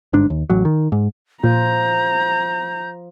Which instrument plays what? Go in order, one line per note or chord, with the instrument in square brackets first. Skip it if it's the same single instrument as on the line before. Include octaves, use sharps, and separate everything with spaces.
[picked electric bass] G1 G#2 D4
D#2
A1 F#3
D#3
G#2
[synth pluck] A#2 [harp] F3 [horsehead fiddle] A#5 [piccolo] G6